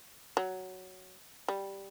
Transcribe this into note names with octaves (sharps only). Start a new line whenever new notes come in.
F#3
G3